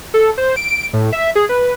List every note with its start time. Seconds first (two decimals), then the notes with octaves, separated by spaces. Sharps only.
0.14 A4
0.38 C5
0.56 D7
0.93 A2
1.13 E5
1.35 G#4
1.49 B4